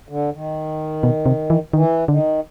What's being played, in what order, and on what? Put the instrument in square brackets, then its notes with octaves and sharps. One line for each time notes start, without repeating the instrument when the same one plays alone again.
[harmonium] D3
D#3
[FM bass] B2
C3
E3
[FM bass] D#3 [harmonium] E3
[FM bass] D3 [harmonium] D#3